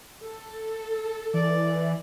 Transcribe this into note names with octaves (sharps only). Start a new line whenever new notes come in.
A4
E3 D5